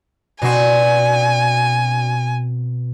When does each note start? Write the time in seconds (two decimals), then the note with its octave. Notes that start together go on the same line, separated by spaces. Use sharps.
0.42 B2 C4 D4 F#4 G#5